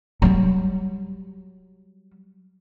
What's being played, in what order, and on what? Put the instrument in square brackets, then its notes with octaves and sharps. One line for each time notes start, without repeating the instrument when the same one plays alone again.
[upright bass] F#3 G3